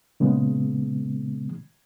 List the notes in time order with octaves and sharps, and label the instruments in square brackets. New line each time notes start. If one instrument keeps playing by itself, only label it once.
[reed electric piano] A#2 C#3 G#3 B3